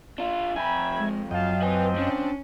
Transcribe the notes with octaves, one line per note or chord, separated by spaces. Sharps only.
D4 F4
F2 E5 G5 G#5 B5 G#6
G#3
F#2 F#3 F4 D#5 F5 G5 A5
F3 C4 B4 G#5
C#4 D4